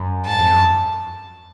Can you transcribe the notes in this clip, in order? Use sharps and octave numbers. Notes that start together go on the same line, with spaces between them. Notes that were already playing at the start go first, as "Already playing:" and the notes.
Already playing: F#2
G#2 A5
F2
F#2